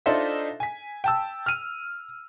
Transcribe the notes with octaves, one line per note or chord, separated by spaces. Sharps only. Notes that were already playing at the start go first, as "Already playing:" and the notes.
D4 D#4 F4 A4 C5 E5
G#5 B6
G5 A5 E6
F6 D#7